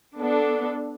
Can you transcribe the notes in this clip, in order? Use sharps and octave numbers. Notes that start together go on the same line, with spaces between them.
B3 D4 A4